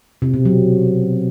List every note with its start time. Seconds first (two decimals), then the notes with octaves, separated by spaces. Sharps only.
0.22 C3
0.34 B2
0.45 F#3